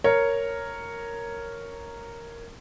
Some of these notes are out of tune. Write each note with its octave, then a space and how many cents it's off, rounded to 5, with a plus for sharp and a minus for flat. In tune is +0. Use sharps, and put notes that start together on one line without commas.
A#4 -5 C#5 +0